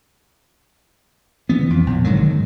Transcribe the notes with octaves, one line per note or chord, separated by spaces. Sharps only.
E3 B3
F2
A#1
G#2 D3 D#3 F#3